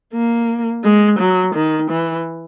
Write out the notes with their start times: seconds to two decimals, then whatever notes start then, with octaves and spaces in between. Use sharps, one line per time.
0.13 A#3
0.84 G#3
1.19 F#3
1.55 D#3
1.90 E3